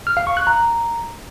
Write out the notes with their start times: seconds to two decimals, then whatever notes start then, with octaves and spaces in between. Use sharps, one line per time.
0.07 F6
0.17 F5
0.27 C#6
0.37 F#6
0.47 A#5